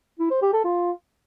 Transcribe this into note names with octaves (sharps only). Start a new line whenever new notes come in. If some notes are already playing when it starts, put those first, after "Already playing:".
E4
C5
G4
A4
F4